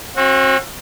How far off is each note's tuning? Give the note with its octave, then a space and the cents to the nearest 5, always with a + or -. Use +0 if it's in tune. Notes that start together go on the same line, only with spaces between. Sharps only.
C4 +40 F#4 -20